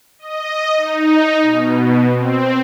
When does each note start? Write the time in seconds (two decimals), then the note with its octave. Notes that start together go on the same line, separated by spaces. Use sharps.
0.19 D#5
0.77 D#4
1.42 B2
2.13 C4